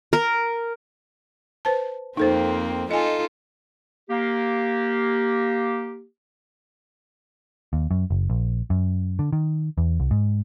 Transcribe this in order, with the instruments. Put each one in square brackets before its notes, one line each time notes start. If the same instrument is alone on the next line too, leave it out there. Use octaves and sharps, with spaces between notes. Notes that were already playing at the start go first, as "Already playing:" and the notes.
[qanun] A#4
[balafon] B4 C5 A5
[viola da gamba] F2 A#3 C4 [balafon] D#4 A4 C5
[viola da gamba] D#4 F4 A4 [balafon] D#5 G#5
[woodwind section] A#3 G4
[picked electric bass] D#2
F#2
F#1
A#1
F#2
D3
D#3
E2
C2
G#2